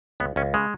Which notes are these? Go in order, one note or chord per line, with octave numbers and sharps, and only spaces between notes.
C#2 B3
C#2 C#4
C#3 G#3